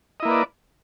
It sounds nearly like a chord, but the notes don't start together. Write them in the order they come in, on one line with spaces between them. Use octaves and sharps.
D#5 E4 A#3 B4 D5